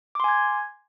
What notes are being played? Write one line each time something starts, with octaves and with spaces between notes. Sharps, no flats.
G#5 C6 D6 G#6